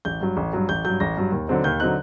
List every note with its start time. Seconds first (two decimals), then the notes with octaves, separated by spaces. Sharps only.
0.05 A1 G6
0.21 G2 F#3
0.37 A1
0.53 G2 F#3
0.69 A1 G6
0.85 G2 F#3 G6
1.00 A1 A#6
1.17 G2 F#3
1.32 D#2
1.48 D3 F#3 C4 D#4
1.64 D#2 G6
1.80 D3 F#3 C4 D#4 F#6